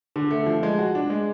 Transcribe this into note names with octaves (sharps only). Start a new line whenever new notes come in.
D3
A3
F3
G#3
F#4
D4
G#3